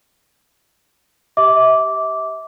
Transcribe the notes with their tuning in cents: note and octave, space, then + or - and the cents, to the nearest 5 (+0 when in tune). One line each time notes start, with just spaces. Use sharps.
G4 -5 E5 -35 D6 -10